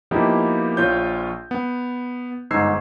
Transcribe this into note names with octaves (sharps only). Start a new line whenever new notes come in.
F3 A#3 B3 D#4 E4 G4
A#1 F4 C#5 G6
B3
G1 G#2 D#4 E6 G#6 C7